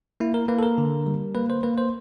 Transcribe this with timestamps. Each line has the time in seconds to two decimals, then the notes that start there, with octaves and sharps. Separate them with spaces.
0.20 A#3 E4
0.34 A#4
0.48 A#3 B4
0.59 A4
0.63 A#4
0.78 D3
1.06 G3
1.35 A#3 B4
1.50 C5
1.63 A#3 B4
1.78 C5